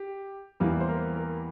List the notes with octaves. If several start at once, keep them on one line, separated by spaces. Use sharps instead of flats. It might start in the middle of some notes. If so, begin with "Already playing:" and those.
Already playing: G4
E2 E3 G3 A#3
C5
A#4
A#4